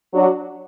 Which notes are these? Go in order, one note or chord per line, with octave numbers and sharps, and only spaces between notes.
F#3 D4 F#4